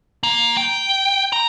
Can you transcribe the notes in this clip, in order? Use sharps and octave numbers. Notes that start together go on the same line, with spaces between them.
A#3
G5
A#5